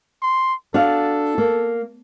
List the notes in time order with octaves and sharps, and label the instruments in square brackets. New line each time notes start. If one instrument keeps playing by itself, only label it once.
[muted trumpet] C6
[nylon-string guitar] D4 F#4 F5 [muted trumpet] A4
[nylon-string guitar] A#3